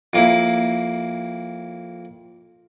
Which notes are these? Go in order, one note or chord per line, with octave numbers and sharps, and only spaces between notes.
F2 A#3 E4